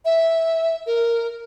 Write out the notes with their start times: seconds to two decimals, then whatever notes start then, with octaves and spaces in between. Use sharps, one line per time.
0.05 E5
0.87 A#4